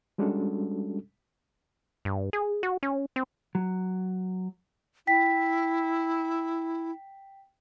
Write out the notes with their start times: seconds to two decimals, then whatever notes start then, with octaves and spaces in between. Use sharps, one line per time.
0.18 G3 G#3 C#4 D4 F#4 A4
2.05 G2
2.33 G#4
2.63 F#4
2.83 C#4
3.16 C4
3.55 F#3
5.07 E4 G5 B6